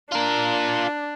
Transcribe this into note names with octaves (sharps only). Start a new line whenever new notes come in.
D4 F4 A#4